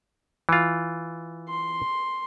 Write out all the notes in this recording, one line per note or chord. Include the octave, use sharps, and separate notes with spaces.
E3 F4
C6